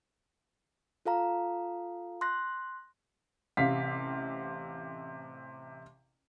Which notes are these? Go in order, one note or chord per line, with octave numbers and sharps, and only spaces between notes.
F4 A4 F5 A#5
C6 F#6 A#6
A1 C3 F5 B6